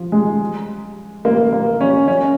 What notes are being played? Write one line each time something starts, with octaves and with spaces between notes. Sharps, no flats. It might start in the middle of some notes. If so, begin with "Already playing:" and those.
Already playing: F3
G#3
A#3
A#3
C#4
C#4